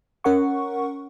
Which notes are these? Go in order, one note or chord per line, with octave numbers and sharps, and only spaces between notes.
C#4 A#4 F#5 C#6